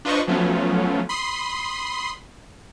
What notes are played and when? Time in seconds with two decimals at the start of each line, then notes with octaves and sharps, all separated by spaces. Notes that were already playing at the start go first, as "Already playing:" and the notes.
0.05 D4 F4 B4 C5 D#5 C#6
0.27 F3 F#3 A3 B3 C#4 F4
1.09 B5 C6 D#6 C7